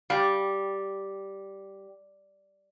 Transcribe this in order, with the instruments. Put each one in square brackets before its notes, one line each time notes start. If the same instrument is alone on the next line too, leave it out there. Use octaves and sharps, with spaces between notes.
[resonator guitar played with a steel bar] G3 [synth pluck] F5 G5